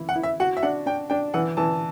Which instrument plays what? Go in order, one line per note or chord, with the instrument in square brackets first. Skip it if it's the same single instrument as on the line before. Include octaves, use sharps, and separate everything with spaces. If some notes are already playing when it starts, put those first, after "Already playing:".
Already playing: [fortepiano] E3 E4
[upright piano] F#5
[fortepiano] E4
[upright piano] E5
[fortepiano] F#4 [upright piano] F#5
[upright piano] E5
[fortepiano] D4 [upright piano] F#5
[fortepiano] D4 [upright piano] G5
[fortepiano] D4 [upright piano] G5
[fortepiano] E3 [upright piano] F#5
[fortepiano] E3 [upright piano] A5